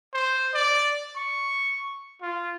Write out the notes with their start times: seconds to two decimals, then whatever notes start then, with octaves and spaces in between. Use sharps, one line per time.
0.14 C5
0.54 D5
1.16 C#6
2.22 F4